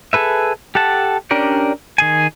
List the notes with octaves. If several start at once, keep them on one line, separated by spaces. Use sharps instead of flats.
G#4 A4 B4 E5
G4 A4 F#5 A5
C#4 D4 G4 A#4 D5
D#3 G#4 G#5